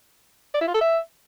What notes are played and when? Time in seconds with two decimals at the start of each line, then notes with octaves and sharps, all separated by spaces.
0.54 D5
0.61 E4
0.68 F4
0.74 A4
0.81 E5